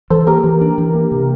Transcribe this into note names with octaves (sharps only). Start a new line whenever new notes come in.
E3 A4 C5
A#3 G4 A#4
E3
D4
E3
A#3
C3